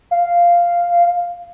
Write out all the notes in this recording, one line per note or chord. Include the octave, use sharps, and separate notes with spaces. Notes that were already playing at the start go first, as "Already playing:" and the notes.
F5